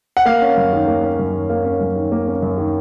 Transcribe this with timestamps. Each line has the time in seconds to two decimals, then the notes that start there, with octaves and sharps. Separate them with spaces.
0.17 F#5
0.25 A#3 F5
0.42 C#4
0.57 F#2
0.73 D#3
0.87 A#3
1.03 C#4
1.19 F#2
1.34 D#3
1.50 A#3 F5
1.65 C#4
1.81 F#2
1.96 D#3
2.12 A#3
2.27 C#4
2.42 F#2
2.58 D#3